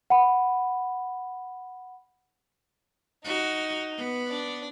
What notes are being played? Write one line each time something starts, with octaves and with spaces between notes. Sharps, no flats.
F#5 B5
D#4 F#4
B3
D4 D5